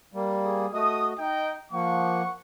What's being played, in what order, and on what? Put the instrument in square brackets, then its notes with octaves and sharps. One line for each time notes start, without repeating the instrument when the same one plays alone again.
[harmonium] G3 A#3
[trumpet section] G#4
[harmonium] A3 F#4 D#5 [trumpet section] D#6
[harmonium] D#4 [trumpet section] D#5 G5
[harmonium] F3 A#3 [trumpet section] F#5 C#6